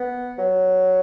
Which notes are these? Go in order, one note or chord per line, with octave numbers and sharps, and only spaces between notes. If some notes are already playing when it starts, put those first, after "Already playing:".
Already playing: B3
F#3